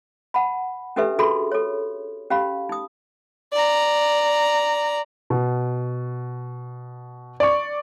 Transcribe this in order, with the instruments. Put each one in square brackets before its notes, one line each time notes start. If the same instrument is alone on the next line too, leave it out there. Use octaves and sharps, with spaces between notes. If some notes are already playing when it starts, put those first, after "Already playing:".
[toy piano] F#5 A5 B5
C#4 D4 G4 A4 B4 E5
D4 F#4 G#4 A4 B5 C6
A4 C#5
C#4 G4 F5 B5
D#4 D#6
[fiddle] D5 A#5
[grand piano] B2
D5 C#6